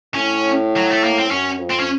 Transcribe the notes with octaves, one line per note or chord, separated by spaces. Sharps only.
A2 C#4
F#3
A3
A#3
C4
F#2 C#4
F2
C4
C#4